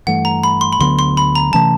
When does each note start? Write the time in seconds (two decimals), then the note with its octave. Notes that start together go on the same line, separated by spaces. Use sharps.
0.07 G2 E3 A3 F#5
0.25 A#5
0.44 B5
0.61 C6
0.73 B5
0.79 D2 D3 F#3 B3 C6
0.99 C6
1.17 B5
1.35 A#5
1.53 C3 E3 A3 C#4 A5